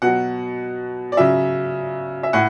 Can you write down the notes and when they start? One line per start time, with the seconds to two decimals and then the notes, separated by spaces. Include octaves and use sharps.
0.02 B2 F#3 F#5
1.12 D5
1.17 C#3 F#3 E5
2.23 E5
2.33 A2 F#5